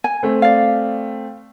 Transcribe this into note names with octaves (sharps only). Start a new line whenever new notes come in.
G#5
A3 C4
D5 F5